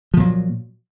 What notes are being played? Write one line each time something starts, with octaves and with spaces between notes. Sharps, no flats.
A#2 F3 F#3